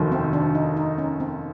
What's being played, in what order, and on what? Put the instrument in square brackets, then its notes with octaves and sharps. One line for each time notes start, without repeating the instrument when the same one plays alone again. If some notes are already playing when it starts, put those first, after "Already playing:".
Already playing: [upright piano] F1 D#2 D#3 F#3
[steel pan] C4
D4
D#4
D#4
C#4
C4